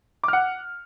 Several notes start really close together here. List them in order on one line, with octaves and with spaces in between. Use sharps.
D6 F6 F#5